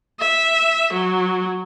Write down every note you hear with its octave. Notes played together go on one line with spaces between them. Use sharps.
E5
F#3